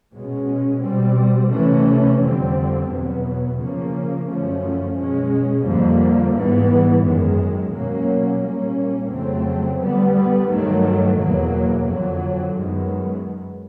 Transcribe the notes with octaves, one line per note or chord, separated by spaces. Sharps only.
B2 G#3 C#4
B2 G3 C4
C3 E3 A3 C#4
F2 D3 G3 C4
E2 B2 F#3 B3
C#3 F3 A#3 C#4
F#2 D3 F3 A3 C#4
B2 G#3 C#4
F2 D3 G3 A#3
G#2 E3 G3 B3
F#2 D#3 G#3
B2 F#3 A#3 C#4
A#2 G3 A#3 C#4
F2 C#3 F#3 A3 C4
D3 G3 B3
G2 D#3 F#3 A3
E2 B2 F#3 A#3
F2 D3 F#3
F#2 D#3 G#3 B3